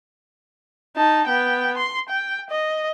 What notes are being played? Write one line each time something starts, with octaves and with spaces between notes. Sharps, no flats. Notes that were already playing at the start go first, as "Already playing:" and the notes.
D#4 A5
B3 G5
C6
G5
D#5